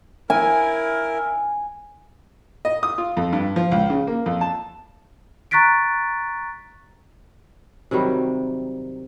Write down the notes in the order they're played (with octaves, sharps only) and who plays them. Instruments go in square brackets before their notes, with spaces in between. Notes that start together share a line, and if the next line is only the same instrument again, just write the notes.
[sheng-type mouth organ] E4 A#4 [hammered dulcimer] G#5
[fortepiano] D#5
D#6
F4
F2
G2
F3
C#2
C#3
A#3
F2
A5
[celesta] A#5 C#6 F#6 A6 B6 D7
[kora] C3 D#3 F#3 G3